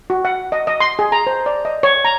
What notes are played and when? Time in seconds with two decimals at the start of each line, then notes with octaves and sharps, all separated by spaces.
0.10 F#4
0.25 F#5
0.52 D#5
0.67 D#5
0.80 C6
0.99 G#4
1.12 A#5
1.27 C5
1.46 D5
1.65 D#5
1.83 C#5
2.05 A#5